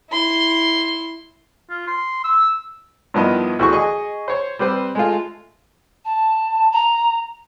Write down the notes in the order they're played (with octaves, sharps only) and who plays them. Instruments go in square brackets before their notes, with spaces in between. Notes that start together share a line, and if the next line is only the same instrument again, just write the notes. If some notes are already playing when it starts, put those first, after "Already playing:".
[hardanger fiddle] E4 C6
[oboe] F4
C6
E6
[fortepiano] G2 D#3 F3 B3 E4 D#5
D2 E3 F#4 G#4 C#6
G#4 D#5 C#6
C5 C#5
G3 C4 G4 B4 C5
G#3 A3 F4
[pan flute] A5
A#5